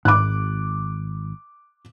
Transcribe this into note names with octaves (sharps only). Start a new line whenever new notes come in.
G#1 G#2 B5 D6 F#6